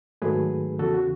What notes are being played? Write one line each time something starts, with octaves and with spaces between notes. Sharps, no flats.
G#2 D#3 F#3 A3 G#4 B4
E2 C#3 E3 F#4 A4
F#4